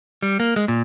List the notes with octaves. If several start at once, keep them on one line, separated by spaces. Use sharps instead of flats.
G3
A#3
G#3
A#2